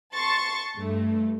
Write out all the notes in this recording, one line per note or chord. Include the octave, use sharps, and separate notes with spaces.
A5 C6 C#6 A6
G2 A3